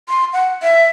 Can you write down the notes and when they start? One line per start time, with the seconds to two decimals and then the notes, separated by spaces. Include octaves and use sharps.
0.09 C6
0.33 F#5
0.63 E5